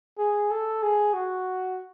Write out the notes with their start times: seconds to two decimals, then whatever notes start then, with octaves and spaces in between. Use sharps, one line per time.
0.18 G#4
0.51 A4
0.82 G#4
1.14 F#4